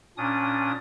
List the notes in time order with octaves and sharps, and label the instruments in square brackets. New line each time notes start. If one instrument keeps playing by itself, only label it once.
[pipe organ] A#2 C#4 D4 D#6